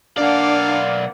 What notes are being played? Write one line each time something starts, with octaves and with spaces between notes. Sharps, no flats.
B1 A#3 D4 D5 F5 F#5